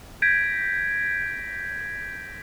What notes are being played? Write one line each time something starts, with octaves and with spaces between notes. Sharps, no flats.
G6 G#6 A#6 B6 D7